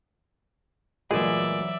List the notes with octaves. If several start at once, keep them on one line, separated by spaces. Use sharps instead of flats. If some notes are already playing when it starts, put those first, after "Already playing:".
D2 A#2 E3 F#3 G#3 G#4 D5 E5